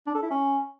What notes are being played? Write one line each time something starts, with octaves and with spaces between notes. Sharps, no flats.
D4
A4
E4
C#4